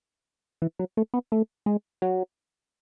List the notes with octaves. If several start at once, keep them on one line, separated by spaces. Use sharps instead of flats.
E3
F#3
A3
B3
A3
G#3
F#3